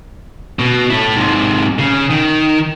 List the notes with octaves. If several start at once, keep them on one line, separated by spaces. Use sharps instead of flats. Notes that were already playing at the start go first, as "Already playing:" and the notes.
B2
A3 E4
G#2 C3
C#3
D#3